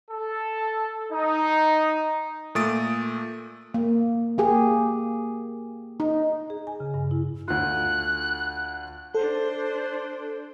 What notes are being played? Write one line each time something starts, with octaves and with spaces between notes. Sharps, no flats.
A4
D#4
A#2 A3 D#6 A6 D7
A#3
A#3 G4 G#4
D#4
G#4
G#5
C#3
G2
E4
D2 F4 F#6
D4 A4 C5